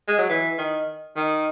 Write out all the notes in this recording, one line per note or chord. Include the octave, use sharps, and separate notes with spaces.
G#3
F#3
E3
D#3
D#3